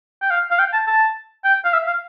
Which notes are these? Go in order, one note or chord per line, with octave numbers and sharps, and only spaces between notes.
G5
F5
F5
G5
A5
A5
G5
F5
E5
F5